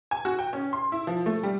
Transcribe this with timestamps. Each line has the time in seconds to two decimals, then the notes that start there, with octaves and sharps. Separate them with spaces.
0.11 G#5
0.25 F#4
0.39 G5
0.53 C#4
0.73 C6
0.92 E4
1.07 F3
1.26 A3
1.43 G3